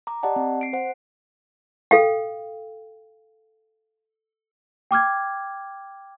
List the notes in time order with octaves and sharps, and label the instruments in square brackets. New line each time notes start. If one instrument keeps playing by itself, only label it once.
[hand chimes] A#5 D6
G4 D5 D#5 F#5 A5
C4
C7 D7
C5 F#5
[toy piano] A4 F5 G5
[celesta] G5 D6 F6 G#6